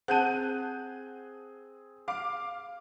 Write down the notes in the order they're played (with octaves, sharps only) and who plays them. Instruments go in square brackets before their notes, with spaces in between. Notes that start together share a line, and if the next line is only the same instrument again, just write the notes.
[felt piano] C4 G#4 [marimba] F#5 A5 [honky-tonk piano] F#6 G6 D#7
[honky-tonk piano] F5 D6